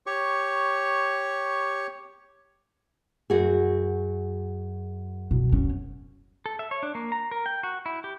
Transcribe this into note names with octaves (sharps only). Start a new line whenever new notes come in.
G4 C#5 C#6
F#2 F#4 G#4
B2
C#4
A4
E5
C#5
D4
A#3
A#5
A#4
G5
F#4
E4
G4